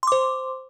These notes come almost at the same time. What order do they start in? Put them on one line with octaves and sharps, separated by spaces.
C6 D6 C5